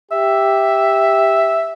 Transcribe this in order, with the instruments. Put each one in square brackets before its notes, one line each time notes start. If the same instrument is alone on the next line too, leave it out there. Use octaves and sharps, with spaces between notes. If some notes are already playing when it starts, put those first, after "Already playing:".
[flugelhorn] G4 [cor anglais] E5